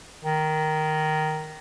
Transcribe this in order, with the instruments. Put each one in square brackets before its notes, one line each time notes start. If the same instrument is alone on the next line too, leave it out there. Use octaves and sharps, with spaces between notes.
[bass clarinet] D#3